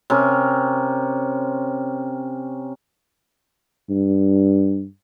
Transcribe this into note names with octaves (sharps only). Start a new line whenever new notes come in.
C3 C#4 A#4
G2